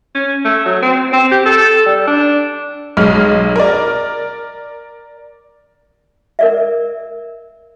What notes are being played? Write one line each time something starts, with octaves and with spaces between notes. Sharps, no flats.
C#4
A3
F#3
C4
C4
G4
A4
G3
D4
B1 G#3 F6
A#4 D5
A#4 D5 E5